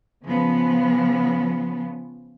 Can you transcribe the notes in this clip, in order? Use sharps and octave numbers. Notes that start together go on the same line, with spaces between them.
C#3 F3 B3